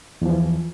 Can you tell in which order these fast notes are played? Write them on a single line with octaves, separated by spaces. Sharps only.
E2 F3 E3